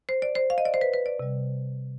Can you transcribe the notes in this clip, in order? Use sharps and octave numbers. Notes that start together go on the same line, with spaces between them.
C5
D5
C5
F5
D#5
D5
C5
B4
B4
D5
C3 G3